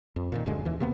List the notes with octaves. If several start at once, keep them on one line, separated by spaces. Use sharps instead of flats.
F2
A#2 D3 D#3
D1 F#2 D3 G#3
D#2 E3
C3 A#3 B3